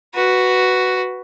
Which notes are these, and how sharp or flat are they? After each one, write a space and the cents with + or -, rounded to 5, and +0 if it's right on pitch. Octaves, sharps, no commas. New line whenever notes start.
F#4 +0 B4 +0